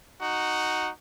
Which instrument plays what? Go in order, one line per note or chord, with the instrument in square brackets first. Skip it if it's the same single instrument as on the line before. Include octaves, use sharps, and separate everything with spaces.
[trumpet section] D#4 F#4